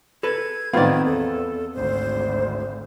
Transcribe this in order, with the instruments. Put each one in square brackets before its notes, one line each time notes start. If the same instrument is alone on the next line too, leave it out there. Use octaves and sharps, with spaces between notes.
[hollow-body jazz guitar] A4 B4 [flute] G#6
[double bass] A2 D#3 [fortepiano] B3 F4 [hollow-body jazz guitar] C4 D5
[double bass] E2 [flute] A4
[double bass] G#1 D2 [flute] C5